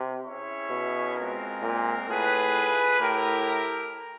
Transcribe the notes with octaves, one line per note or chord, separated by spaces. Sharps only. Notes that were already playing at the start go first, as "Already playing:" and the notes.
Already playing: C3
C#4 E4 G#4 C#5 E5
B2
G#3 C4 F4 A#4
A#2
A2 F4 G#4 B4
A2 E4 G4 A#4